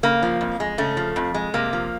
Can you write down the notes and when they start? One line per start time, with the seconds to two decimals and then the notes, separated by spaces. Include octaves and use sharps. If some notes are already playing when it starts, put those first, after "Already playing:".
0.03 C#3 A#3
0.23 F3
0.41 F2
0.60 G#3
0.78 C#3 A3
0.97 F3
1.16 F2
1.34 G#3
1.54 C3 A#3
1.73 F3